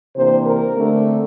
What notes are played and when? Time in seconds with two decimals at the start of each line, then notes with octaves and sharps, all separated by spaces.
0.16 C3 E3 A#3 D4 C5
0.47 A#4
0.76 D3 A3 C4